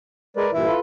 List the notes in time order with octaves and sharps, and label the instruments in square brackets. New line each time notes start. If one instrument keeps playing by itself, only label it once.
[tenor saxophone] G#3 [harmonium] A#4 B4 D5
[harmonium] G2 A#2 E3 [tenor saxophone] E4
[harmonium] F4 A4 B4